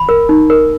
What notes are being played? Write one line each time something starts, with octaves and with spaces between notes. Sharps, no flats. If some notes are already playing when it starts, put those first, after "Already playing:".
Already playing: B5
A#4
D#4
A#4